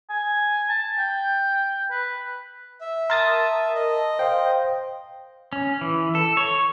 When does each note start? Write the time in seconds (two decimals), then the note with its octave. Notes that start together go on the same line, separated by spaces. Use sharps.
0.10 G#5
0.69 A5
0.99 G5
1.91 B4
2.81 E5
3.10 A#4 A5 C6 D#6
3.75 D#5
4.19 C5 F5 G5 C6
5.53 C#4
5.81 E3
6.15 A4
6.37 C#5